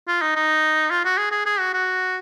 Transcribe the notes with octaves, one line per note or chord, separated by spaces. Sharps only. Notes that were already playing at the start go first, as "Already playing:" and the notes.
F4
D#4
D#4
F4
F#4
G#4
G#4
G#4
F#4
F#4